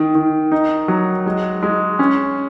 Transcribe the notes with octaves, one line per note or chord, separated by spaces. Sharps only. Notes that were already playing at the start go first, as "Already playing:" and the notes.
Already playing: D#3
D#3
D#4
F#3
G#3
G#3
C#4